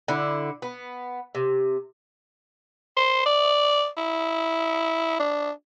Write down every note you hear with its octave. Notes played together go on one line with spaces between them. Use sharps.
D3 E4
B3
C3
C5
D5
E4
D4